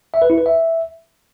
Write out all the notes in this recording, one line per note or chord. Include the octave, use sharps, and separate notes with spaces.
E5
B4
E4
B4
E5